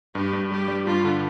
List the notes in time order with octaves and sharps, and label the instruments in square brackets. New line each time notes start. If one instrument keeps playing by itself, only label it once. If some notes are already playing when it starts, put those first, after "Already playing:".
[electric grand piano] G2 [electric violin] G4
[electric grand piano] G2
[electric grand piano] G3 [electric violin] G4
[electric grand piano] G3
[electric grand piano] G2 [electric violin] F4
[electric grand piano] D3